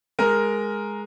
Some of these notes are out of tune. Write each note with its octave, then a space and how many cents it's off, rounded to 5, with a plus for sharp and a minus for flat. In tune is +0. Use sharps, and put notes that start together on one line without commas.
G#3 +0 A#4 +0